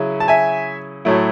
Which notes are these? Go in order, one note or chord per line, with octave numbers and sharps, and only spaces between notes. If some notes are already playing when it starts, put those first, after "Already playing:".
Already playing: C#3 F#3 C#4 E4
A5
E5 G#5
A2 F#3 A3 E4